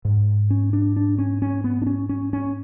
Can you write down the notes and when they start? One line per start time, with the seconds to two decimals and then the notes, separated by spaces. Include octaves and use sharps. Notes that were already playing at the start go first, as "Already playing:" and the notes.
0.05 G#2
0.50 C#4
0.73 D4
0.96 D4
1.18 C#4
1.42 C#4
1.64 B3
1.82 D4
1.86 C#4
2.09 C#4
2.33 C#4